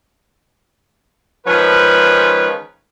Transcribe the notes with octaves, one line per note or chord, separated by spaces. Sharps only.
D#3 F3 G#3 C#4 B4